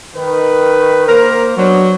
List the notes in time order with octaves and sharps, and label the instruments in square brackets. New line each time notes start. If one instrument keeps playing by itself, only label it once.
[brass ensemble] D#3 B4
[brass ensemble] A#3 C5 [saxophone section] A#4
[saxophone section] F#3 [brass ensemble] B3 D4 C5